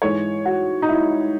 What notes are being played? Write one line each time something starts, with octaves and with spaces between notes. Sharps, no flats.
G#2 E3 G#3 C#5
F#4
D#4
E4